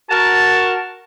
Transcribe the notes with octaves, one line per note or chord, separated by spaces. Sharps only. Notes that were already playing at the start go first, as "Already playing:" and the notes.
F#4 A#4 A5